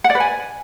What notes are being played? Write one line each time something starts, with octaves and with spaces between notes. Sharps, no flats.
F#5
D5
B4
G#5